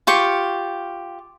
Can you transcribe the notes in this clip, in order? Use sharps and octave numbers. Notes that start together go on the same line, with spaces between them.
F4 G4 C#6